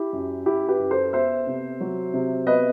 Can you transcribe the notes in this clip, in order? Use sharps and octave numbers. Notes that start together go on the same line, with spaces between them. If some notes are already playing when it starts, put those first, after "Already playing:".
Already playing: E4 G4
F#2
F#2 E4 G4
G4 B4
F#2
A4 C5
B3 C5 E5
C3
F#3
C3
B3 B4 D#5